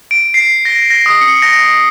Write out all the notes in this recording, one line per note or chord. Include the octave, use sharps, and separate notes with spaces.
D7
C7
A#6
A#6
D#6
C#7
A#6